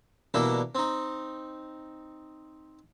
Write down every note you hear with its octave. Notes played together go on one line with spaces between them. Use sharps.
B2 E3 G3 A#3 D4 E4
C4 D#4